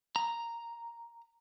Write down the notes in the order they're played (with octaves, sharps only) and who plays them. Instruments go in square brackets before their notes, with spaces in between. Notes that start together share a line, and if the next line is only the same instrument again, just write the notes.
[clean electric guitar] A#5